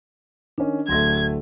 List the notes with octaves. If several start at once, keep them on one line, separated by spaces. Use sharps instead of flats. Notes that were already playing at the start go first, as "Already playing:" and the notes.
D#3 C#4 D4
D1 D3 A3 C6 G#6 A#6